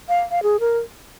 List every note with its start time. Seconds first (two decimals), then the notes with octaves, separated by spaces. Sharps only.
0.09 F5
0.31 F5
0.43 G#4
0.60 A#4